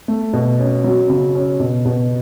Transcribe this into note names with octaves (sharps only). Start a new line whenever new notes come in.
A3
B2
C#4
F#3
C#3
C#4
B2
B2